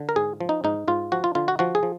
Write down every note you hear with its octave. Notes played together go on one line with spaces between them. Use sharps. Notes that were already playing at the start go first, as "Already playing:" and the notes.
Already playing: D3
A#4
G#2 G#4
F3
D#4
G#2 D#4
G#2 F4
F3 F#4
F4
D3 F4
F#4
F3 F#4
G#4
F3